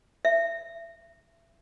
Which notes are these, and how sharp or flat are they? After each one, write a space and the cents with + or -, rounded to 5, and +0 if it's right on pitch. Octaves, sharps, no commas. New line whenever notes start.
E5 +25